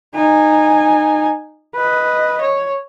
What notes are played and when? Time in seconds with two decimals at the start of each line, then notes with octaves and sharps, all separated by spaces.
0.15 D#4 G#5
1.76 B4 D#5
2.41 C#5